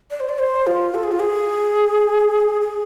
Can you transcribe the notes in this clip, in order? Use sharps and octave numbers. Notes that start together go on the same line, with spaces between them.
D5
C5
D5
C5
F4
A4
G#4
F4
G#4
G#4